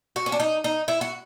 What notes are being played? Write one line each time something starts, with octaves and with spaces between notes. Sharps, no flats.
F#4
C#4
D4
D#4
D#4
E4
F#4